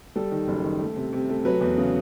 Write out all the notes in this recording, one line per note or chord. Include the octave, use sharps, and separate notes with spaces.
G3 A4
D#3
F#1
D#3
A3
C3
C3
A3
F#3 B4
E2
C#3